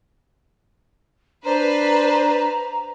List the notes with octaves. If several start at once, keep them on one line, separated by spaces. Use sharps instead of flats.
D4 B4 C5 A#5